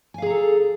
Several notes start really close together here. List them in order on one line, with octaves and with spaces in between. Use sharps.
G#5 F5 G#4 A#5 A4